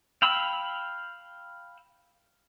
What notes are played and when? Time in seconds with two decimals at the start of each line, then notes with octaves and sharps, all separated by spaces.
0.22 F5 G5 B5 E6